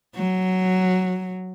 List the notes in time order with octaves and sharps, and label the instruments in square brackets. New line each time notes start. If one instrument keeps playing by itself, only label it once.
[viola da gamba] F#3